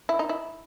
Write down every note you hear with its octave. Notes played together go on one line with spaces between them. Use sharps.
E4
D#4
E4